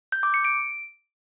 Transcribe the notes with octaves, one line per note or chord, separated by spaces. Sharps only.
G6
D6
C#7
D7